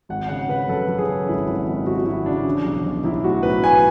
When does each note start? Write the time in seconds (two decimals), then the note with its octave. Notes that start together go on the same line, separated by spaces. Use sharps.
0.09 G#1 F#5
0.29 C#3 F#5
0.49 C#3 B4
0.68 F#2 A4
0.88 F#2
0.98 G#4
1.07 C#3
1.28 G#1 E4
1.48 G#1
1.67 G#1
1.86 G#1 F#4
1.98 F#4
2.06 G#1 E4
2.26 C#3 D4
2.46 E3
2.64 B1
2.84 B1
3.04 B1 E4
3.24 A2 F#4
3.43 A2 B4
3.63 A2 G#5